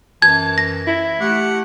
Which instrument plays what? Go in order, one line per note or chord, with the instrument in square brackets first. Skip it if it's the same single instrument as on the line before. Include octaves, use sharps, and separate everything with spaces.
[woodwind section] F#2 E3 [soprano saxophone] A5 [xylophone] G#6
[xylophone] A#6
[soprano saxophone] E4
[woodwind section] A3 G4 [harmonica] F#5